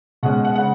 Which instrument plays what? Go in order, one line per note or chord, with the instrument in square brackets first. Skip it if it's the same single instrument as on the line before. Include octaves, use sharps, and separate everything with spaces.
[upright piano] B2 G#3 C#4 F#5
F#5
C#3 G#3 F#5